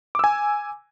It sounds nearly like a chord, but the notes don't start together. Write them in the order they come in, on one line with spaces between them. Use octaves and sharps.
D6 E6 G#5